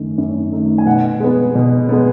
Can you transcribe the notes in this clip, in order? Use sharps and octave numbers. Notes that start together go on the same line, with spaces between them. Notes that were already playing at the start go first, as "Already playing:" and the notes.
Already playing: F#2 D#3 A3
F#2
D#3 A3
G#5
B2 F#5
G#3 B3
B2
G#3 B3